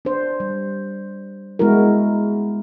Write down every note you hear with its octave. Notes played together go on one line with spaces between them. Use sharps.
D4 C5
G3
G#3 B3 E4 F#4 A#4